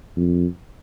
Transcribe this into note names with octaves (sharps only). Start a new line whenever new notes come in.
F2